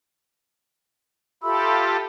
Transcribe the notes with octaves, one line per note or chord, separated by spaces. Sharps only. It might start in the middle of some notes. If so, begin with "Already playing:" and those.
F4 G4 A4 E5 B5 E6